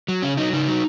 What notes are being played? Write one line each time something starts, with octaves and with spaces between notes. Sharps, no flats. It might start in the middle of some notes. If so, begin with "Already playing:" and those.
F#3
C#3 C#4
F#3 D#4
C#3 D#4
F#3